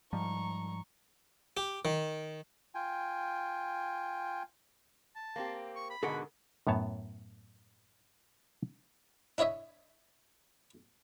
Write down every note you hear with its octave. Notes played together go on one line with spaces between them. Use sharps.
G#2 F3 G3 A#5 C#6
G4
D#3
F4 G5 G#5
A5
A#3 C4 G4
C#6
B5
G#2 B2 D3 G#4 A#4 F#5
F#2 A2 B3 C#5 A5
D4 E4 C#5 D#5 E5